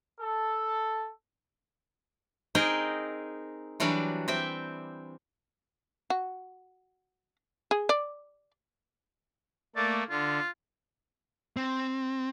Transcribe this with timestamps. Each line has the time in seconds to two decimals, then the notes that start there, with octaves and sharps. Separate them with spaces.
0.20 A4
2.55 C4 D#4 G#4 A#4 D#5 G5
3.80 E3 F#3 G3 D4 F#4
4.28 C4 E5 G5
6.10 F#4
7.71 G#4
7.89 D5
9.76 A3 A#3 D5
10.10 D3 F4
11.57 C4